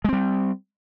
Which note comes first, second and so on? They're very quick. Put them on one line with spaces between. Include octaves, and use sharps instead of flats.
G#3 C4 G3